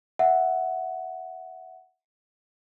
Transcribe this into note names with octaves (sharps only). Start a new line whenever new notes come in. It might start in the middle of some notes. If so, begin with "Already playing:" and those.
E5 F#5